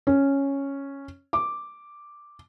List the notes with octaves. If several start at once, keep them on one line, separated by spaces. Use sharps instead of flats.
C#4
D6